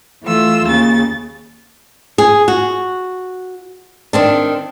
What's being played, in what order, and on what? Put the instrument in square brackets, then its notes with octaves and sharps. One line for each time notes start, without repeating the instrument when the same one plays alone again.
[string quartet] E3 A3 F4 E6
D#2 C#3 A6
[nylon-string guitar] G#4
F#4
D#3 C4 D4